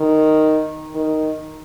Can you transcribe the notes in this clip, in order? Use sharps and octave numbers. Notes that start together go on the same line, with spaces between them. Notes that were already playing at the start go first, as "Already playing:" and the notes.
Already playing: D#3
D#3